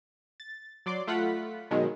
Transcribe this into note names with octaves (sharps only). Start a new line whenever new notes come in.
A6
F#3 D5 C6 D6
A3 F4 F#5 B5 B6
B2 D#3 F#3 G#3